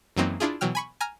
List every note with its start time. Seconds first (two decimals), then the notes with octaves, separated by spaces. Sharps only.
0.16 F#2 E3 F#3 A#3 C4 D#4
0.40 D4 E4 F4 G#4
0.61 B2 E3 F#3 G5 F6
0.75 G#5 B5 C#6
1.01 G#5 A#5 F6